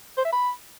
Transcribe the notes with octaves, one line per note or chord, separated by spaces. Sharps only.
C5
E5
B5